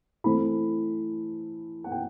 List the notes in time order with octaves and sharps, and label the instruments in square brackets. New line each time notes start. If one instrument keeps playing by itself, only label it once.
[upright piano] E3 A3 C4 E4 B5
F#5
G5